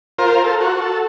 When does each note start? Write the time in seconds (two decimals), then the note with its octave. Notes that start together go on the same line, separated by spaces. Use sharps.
0.19 F4 A#4 C5
0.44 A4
0.61 F#4
0.81 A4